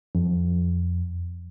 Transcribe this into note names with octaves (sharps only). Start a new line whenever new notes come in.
F2